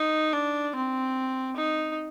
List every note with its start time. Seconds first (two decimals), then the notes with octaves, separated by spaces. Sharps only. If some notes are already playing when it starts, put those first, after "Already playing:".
Already playing: D#4
0.33 D4
0.75 C4
1.57 D#4